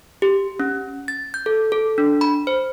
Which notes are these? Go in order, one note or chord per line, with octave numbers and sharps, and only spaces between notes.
G4
C#4
A6
G6
A4
A4
D4
B5
C5